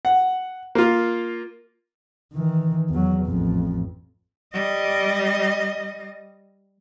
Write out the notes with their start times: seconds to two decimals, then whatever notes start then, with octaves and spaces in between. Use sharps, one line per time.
0.05 F#5
0.75 A#3 F4
2.34 D#3 E3
2.90 E2 F#3
3.26 A1 F2
4.53 G3 D#5